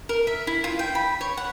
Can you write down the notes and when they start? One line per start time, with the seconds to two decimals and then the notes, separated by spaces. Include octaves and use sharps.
0.09 A#4
0.27 E5
0.47 E4
0.64 F4
0.79 G5
0.95 B5
1.21 C#5
1.37 F#5